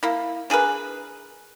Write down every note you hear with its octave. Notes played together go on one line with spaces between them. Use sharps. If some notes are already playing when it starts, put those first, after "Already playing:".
A#3 E4
D4 G#4 A#4 B4